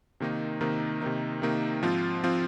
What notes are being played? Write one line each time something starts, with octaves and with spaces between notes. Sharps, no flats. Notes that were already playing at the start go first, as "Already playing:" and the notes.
C3 D#3 A#3 D#4
C3 D#3 A#3 D#4
C3 D#3 A#3 D#4
C3 D#3 A#3 D#4
G#2 F3 C4 F4
F3 C4 F4